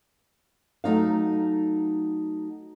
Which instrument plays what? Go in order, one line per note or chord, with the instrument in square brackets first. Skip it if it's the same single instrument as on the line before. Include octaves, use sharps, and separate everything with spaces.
[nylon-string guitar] F#3 A3 D#4 F5